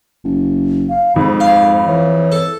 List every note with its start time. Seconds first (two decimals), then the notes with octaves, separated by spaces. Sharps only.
0.24 F#1
0.89 F5
1.16 F2 G#2 B5
1.40 F5
1.87 E3 C#5
2.32 A4